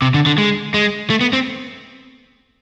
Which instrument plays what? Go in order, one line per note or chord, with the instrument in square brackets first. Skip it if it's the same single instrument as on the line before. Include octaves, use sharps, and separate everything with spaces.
[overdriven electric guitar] C3
D3
D3
G#3
G#3
A3
B3
C4